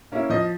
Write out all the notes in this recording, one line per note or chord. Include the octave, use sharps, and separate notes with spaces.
A#3 C#4 E4
F3 D#5